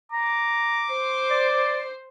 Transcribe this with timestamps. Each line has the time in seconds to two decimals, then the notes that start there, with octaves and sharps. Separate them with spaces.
0.12 A#5 D6
0.91 C5
1.30 D5